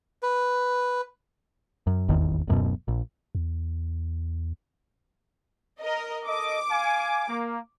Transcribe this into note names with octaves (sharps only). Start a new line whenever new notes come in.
B4
F#2
D#1 G#1 E2 D#3
D1 F#2 B2
A#1
E2
A#4 D#5
A4 D#5 D6
F5 G#5
A#3